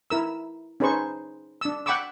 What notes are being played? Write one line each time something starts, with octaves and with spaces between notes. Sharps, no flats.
E4 A#4 E6
C#4 D#4 G#4 B4 C5 C#6
D4 E6
F#5 G5 B5 C#6 D6 E6